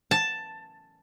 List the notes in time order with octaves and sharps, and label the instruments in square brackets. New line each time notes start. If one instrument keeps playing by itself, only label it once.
[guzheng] A5